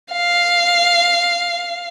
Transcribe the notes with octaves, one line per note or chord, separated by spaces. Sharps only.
F5